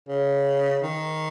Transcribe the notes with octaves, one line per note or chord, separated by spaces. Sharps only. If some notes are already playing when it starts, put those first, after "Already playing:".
C#3
D#3